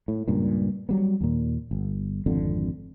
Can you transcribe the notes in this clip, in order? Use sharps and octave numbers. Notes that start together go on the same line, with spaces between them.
A2
C#2 G2 A#2
F#3 G3 B3
D#2 A#2
G1
G#1 F2 D3